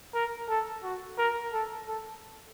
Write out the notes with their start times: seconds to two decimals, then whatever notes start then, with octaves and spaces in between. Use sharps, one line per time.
0.14 A#4
0.49 A4
0.84 F#4
1.18 A#4
1.53 A4
1.88 A4